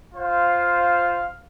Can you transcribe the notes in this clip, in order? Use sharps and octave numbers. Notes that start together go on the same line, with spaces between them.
F4 C5 F5